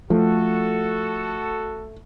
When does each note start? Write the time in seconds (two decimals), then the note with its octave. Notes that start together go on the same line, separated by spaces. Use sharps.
0.10 F3 A3 F#4 A4